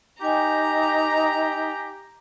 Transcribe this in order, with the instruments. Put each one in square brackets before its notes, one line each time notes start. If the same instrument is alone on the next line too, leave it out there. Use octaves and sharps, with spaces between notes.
[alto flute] D#4 [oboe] G4 [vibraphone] G5 G#5 [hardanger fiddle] A#5